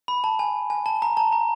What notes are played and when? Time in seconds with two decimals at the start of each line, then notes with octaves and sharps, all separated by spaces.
0.08 B5
0.24 A5
0.39 G#5
0.70 G#5
0.86 A5
1.02 A#5
1.17 A5
1.32 A#5